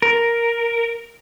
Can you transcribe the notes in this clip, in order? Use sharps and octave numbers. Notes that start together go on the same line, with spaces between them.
A#4